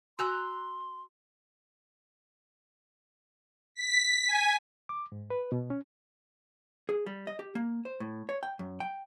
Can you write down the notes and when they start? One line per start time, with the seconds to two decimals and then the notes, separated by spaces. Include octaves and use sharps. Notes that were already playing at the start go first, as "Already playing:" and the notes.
0.19 F#4 G#5 A#5 C6 E6 F#6
3.75 B6
4.27 G#5
4.89 D6
5.12 G#2
5.30 B4
5.52 B2
5.70 C#4
6.89 G#4
7.06 G3
7.27 D#5
7.39 G4
7.55 A#3
7.85 C5
8.00 A2
8.29 C#5
8.43 G5
8.59 F#2
8.80 G5